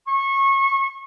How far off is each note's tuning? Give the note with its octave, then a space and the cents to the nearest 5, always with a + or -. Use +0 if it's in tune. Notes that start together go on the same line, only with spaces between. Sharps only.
C#6 -25